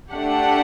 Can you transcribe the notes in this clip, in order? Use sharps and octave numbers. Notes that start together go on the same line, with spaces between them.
A3 D4 G4 F#5